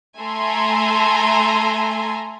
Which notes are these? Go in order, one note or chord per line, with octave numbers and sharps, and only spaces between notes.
A3 A4 G#5 A#5 C6